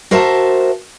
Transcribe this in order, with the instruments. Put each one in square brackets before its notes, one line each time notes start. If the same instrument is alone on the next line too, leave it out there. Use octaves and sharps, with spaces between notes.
[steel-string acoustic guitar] F#4 A#4 C5 E5 A5